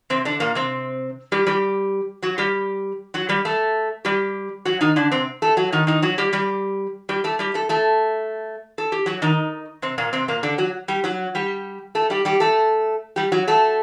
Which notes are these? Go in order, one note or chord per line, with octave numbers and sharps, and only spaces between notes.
C3 C4
D3 D4
A#2 A#3
C3 C4
G3 G4
G3 G4
F#3 F#4
G3 G4
F#3 F#4
G3 G4
A3 A4
G3 G4
F#3 F#4
D#3 D#4
D3 D4
C3 C4
A3 A4
F#3 F#4
D#3 D#4
D#3 D#4
F#3 F#4
G3 G4
G3 G4
G3 G4
A3 A4
G3 G4
A3 A4
A3 A4
A4
G4
F#3 F#4
D#3 D#4
C3 C4
A#2 A#3
C3 C4
A#2 A#3
D3 D4
F#3 F#4
G3 G4
F#3 F#4
G3 G4
A3 A4
G3 G4
G3 G4
A3 A4
G3 G4
F#3 F#4
A3 A4